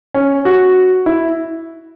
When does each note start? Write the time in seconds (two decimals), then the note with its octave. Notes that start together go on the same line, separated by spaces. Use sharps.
0.14 C#4
0.45 F#4
1.06 E4